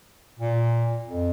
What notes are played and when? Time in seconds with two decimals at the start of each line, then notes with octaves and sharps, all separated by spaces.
0.39 A#2
1.07 F2